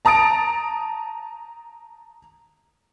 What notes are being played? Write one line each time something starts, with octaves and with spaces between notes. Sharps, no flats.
A5 A#5 D#6 A6 D7